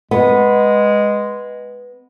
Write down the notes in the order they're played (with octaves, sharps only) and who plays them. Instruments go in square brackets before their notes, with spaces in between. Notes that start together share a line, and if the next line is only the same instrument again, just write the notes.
[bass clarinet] G#3 [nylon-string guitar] B3